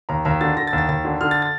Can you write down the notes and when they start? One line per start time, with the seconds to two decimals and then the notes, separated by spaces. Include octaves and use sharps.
0.09 D#2 A#5
0.25 D#2 A#5
0.41 D3 A6
0.57 D3 A#6
0.67 A6
0.73 D#2
0.78 A6
0.88 D#2 A6
1.05 D3
1.21 D3 F6
1.31 A6
1.42 A6